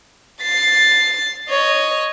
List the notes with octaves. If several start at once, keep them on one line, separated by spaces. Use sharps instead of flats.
A6 C7
C#5 D#5